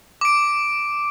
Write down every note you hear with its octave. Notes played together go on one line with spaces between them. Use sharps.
D6 D7